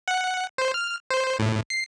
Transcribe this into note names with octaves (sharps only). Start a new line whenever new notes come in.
F#5
C5
F6
C5
A2
C7